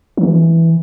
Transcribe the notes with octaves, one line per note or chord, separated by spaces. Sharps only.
E3